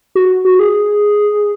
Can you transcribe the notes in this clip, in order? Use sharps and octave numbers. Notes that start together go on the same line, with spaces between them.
F#4
F#4
G#4